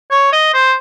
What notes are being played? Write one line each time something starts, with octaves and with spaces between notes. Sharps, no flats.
C#5
D#5
C5